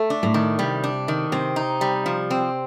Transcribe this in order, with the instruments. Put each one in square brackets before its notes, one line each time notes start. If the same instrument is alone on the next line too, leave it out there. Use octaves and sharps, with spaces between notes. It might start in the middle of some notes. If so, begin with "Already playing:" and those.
Already playing: [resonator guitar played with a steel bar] A3
D4
[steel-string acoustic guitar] A2
[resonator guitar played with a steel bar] D#3
[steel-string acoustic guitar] C3 [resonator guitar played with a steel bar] G3
[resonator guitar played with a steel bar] D4
D#3
[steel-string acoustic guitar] C3 [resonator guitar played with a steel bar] C4
[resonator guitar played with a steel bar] D#4
G3
F3
C4